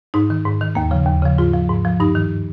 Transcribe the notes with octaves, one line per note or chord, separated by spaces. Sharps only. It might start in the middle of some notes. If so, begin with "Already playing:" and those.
G#2 D#4
D#3
G#2
D#3
D#2 A#3
C#3 F3
D#2
C#3 F3
G#2 F4
F3
G#2
F3
G2 D#4
D#3